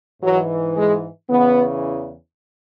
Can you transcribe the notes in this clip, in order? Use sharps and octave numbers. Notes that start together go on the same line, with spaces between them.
G#2 E3 F#3
G#3
E2 C#3 E3 B3